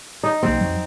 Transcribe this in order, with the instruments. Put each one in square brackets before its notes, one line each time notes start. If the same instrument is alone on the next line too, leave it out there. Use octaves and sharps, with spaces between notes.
[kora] D#4
[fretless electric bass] B1 F#3 A#3 [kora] C4
[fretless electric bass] F2 F#3